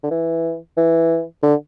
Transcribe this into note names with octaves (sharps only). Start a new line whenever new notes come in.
D3
E3
E3
D3